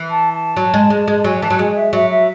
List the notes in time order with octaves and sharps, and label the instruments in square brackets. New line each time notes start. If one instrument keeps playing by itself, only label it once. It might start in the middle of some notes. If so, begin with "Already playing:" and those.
Already playing: [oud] E3
[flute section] A5
A5
[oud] F#3
G#3
G#3
G#3
[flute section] A5
[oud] F#3 [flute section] G#5
[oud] E3 [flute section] A5
[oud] F#3
[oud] G#3 [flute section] G#5
[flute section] E5
[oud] F#3 [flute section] E5
[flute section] E5